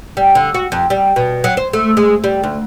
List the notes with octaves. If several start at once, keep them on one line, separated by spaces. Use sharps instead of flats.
G3
D3
F#4
F2
G3
B2
F#3
C5
A3
G#3
G3
D2